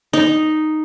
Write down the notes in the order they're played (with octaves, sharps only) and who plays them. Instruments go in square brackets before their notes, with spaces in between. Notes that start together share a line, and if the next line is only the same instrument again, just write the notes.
[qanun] D#4